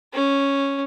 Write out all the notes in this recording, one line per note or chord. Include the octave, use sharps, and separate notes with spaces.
C#4